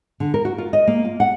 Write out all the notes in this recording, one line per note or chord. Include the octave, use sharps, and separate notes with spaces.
D3
A#4
F#4
F4
D#5
A#3
F4
F#5